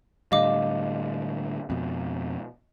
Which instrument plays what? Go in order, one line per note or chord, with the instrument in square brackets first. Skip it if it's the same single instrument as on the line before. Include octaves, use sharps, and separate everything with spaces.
[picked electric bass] A2 D3 G3 [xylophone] D#5 F5 D6
[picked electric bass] F2 B2